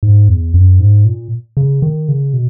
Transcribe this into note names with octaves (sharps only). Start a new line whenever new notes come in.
G#2
E2
F#2
G#2
A#2
C#3
D#3
C#3
B2